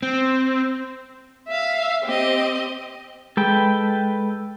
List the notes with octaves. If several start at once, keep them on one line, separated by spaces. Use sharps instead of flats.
C4
E5 F5
C4 G4 D#5
G#3 A4 B4 G5